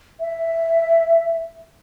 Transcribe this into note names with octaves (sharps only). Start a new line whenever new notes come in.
E5